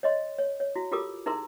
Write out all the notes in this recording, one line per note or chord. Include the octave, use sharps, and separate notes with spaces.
C#5 D#5 C6
C#5
C#5
E4 F#4
F4 G4 A4 A#4 D6 D#6
D#4 E4 G#4 A#4 A#5 C6